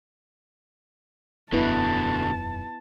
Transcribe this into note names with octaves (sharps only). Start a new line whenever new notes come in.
E1 F#2 B2 D3 B3 E4 B4 A5